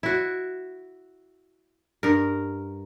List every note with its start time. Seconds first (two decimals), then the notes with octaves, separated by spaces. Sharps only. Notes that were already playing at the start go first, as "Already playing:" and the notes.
0.03 E4 F#4
2.03 G2 A#4